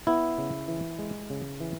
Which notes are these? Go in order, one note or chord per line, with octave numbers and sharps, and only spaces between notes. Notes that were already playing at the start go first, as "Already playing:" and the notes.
B3 E4
C#3
E3
G#3
C#3
E3